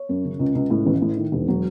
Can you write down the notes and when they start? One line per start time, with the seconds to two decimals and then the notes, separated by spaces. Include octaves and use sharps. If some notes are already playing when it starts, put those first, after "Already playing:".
Already playing: C#5
0.09 F#2
0.25 C#3
0.39 C#2
0.55 C#2
0.70 A2
0.86 A1
1.02 A2
1.17 D#3
1.32 E1
1.48 F#3